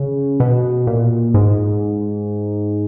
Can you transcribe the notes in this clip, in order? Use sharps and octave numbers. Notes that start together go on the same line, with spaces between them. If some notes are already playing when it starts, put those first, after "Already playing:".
Already playing: C#3
B2
A#2
G#2